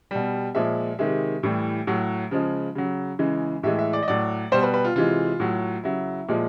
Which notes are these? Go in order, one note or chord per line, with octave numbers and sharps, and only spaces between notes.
B2 G3
A#2 F3 G#3 E5
C3 D#3 G#3 E5
A2 E3 G3
A2 F#3
C#3 F3 G#3
C#3 F#3
C#3 E3 G#3
A2 E3 G#3 E5
E5
D5
D#5
A2 F#3 D5
B2 G3 C5
B4
B4
F4
C3 E3 G#3 F4
A2 F#3
C#3 F#3 E4
A#2 F3 G#3